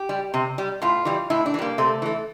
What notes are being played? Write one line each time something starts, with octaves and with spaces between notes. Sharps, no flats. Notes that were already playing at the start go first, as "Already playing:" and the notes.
Already playing: G4
G3
C3
G3
A2 F4
E3 G3
A2 E4
D4
E3
G3 A#3
C3 A3
E3 A3